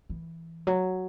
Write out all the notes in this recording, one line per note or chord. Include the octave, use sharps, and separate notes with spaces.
E3
F#3